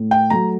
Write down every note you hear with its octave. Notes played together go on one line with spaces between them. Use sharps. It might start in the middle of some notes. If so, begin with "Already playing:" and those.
Already playing: A2
G5
F#3 A3 A#5